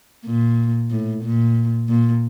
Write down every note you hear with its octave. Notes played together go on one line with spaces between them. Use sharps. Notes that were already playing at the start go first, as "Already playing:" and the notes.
A#2
A2
A#2
A#2